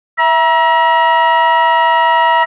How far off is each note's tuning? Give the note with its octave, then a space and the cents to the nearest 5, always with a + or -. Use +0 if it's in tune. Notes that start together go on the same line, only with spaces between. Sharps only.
E5 +0 A#5 +40